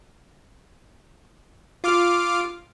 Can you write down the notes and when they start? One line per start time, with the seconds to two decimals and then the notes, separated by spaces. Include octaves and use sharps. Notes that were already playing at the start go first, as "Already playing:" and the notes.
1.84 F4 D6 F6